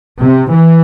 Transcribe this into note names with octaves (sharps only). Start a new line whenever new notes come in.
C3
E3